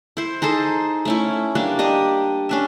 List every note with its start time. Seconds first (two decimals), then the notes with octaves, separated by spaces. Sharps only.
0.17 E4 C5
0.42 D#4 G#4 A4 C5
1.05 A3 C#4 E4
1.55 G3 A#3 D4
1.79 D4 G4 D#5
2.49 C#4 D4 E5